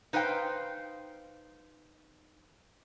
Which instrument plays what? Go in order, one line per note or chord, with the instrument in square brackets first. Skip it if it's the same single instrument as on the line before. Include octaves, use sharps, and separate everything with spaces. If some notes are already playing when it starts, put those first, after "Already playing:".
[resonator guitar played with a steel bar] D#4 B4 C5 F5 G5